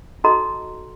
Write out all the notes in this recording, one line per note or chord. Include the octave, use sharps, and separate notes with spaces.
D#4 F#4 A4 D#5 A#5 C6